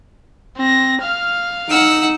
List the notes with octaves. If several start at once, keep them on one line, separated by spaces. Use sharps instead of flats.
C4 A#6
F5 F6
D#4 F#5 E6